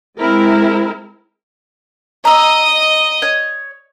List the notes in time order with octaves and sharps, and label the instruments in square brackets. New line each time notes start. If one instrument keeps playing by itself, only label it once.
[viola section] G#3 C4 E4 A#4
[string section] D#5 [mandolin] A#5 E6
[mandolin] C#5